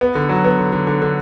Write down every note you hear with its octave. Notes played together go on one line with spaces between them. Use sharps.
B3
D3
F#3
B3
D3
D3
D3
D3